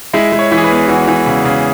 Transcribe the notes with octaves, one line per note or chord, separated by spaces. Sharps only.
G#3 E4
G#3
C#5
E3
G#4
B4
E2
E3 F#4
E3
C#3
C#3